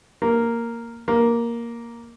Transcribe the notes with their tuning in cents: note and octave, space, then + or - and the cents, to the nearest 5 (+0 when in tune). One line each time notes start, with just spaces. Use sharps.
A#3 -5
A#3 +5